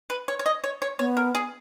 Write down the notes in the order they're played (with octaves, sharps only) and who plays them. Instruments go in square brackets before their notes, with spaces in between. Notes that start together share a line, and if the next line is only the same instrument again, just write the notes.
[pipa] B4
C#5
C#5
D#5
C#5
C#5
[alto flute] B3 [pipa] C#5
[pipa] A#4
G#4